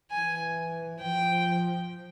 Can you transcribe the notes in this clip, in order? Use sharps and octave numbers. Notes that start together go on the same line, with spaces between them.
E3 G#5
F3 G5